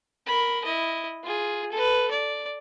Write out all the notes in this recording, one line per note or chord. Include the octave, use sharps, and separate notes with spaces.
A#4 B5
E4 D#5
F4 G#4
A4 B4
D5